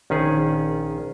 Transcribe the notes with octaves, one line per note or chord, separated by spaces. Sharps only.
A#1 D#3 C#4 G#4